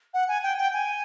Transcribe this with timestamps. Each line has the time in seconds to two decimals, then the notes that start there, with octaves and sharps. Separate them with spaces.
0.14 F#5
0.28 G#5
0.43 G5
0.58 G5
0.73 G#5